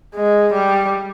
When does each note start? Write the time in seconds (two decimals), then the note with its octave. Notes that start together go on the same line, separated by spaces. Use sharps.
0.15 G#3
0.53 G3